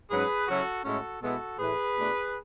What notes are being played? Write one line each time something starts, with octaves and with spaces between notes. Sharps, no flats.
G#2 F#3 C#4 G#4 B4
C#3 F#3 C#4 E4 F#4 A4
A2 G#3 C#4 E4 F#4 A4
B2 G#3 B3 E4 F#4 A4
A2 E3 A3 G#4 B4
B2 A3 D4